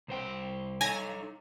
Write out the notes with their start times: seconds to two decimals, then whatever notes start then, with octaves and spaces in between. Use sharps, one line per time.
0.08 C2 C5 G5
0.81 D#4 A4 C#5 G#5 A#6